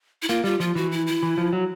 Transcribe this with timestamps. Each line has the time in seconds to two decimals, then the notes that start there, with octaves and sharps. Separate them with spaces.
0.22 E4
0.29 A#3 F4
0.44 G3 F4
0.60 F3 F4
0.75 E3 F#4
0.92 E4
1.07 E4
1.23 E3
1.38 F3
1.53 F#3